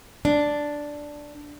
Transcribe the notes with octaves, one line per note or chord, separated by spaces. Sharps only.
D4